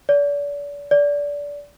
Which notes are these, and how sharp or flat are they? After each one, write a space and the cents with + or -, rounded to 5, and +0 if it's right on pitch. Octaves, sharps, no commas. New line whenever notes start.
D5 -35
D5 -20